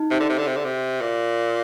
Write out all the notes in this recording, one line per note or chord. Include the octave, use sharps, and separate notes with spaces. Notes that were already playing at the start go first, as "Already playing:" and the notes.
Already playing: D#4
C3
D3
C3
D3
C3
D3
C3
A#2